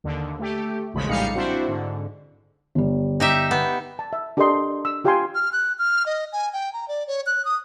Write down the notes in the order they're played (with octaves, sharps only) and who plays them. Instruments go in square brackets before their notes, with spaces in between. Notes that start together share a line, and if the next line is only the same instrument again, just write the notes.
[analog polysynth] D#2 D3
A3 G4
A1 D#2 C#3 F3 G#3 B5
A#1 A2 G3 D#4 F5 C#7
C4 D4 E4 F#4 C5
G#2 D3
[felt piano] G1 G3
[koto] D#4 G4 E5
B3
[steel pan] A5
E5
D4 G4 A4 A#4 D#5 C6
E6
F4 G4 F5 G5 G#5 C6
[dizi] F6
F#6
F6
D#5
G#5
G5
A#5
D5
C#5
F#6
D#6